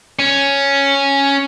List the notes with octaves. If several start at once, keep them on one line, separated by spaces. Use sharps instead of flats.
C#4